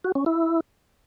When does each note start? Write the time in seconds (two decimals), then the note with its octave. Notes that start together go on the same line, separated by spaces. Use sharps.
0.04 F#4
0.15 C#4
0.26 E4